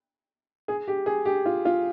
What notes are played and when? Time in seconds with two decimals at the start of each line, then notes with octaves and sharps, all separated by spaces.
0.68 G#4
0.88 G4
1.06 G#4
1.25 G4
1.46 F4
1.65 F4